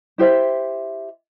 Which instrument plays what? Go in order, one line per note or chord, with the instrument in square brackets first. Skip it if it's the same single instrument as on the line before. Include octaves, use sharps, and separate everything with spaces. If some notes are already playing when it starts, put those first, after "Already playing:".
[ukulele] E4 G4 C5 E5